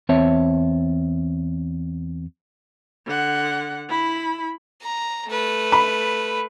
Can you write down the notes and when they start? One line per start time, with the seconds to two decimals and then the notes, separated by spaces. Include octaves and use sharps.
0.09 E2 C4 C#5 E5 A5
3.06 D3 F#5
3.89 E4 B5
4.82 A#5
5.27 A3 B4
5.72 B5